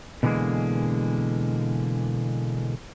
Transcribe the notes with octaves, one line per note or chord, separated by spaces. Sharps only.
B2 D3 E3 F#3 G#3 A#3